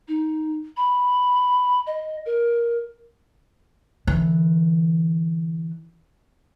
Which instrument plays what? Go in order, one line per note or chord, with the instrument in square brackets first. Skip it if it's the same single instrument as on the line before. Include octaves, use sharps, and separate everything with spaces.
[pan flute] D#4
B5
D#5
A#4
[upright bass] D3 E3